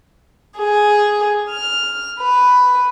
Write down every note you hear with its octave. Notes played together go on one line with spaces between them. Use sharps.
G#4
F6
B4